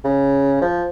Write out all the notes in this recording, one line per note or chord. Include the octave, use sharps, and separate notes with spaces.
C#3
F3